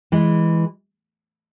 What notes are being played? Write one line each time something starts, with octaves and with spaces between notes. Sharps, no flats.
E3 G#3